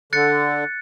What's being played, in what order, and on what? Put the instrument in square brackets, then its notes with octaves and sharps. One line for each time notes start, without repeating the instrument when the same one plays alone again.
[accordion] D3 [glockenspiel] F#6 A6 C#7